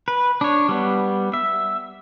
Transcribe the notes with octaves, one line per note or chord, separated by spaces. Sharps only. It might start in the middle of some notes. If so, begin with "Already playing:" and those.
B4
D4 C#5
G3 B3
E5